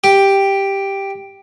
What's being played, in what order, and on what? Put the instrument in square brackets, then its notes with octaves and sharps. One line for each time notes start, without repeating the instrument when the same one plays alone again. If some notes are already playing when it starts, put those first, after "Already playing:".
[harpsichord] G4